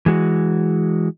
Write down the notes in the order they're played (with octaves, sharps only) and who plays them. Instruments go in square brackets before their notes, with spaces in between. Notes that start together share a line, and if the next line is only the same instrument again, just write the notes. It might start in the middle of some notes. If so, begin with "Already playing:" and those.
[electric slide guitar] E3 G#3 F#4